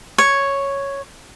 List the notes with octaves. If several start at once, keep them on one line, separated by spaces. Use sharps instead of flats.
C#5